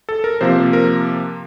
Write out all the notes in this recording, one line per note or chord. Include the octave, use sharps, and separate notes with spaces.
A4
A#4
C3 F3 A#3 C5
A#4